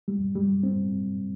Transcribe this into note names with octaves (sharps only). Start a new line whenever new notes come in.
G3
G3
C4